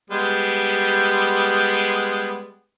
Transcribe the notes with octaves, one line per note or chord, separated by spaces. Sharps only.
G3 G#3 B3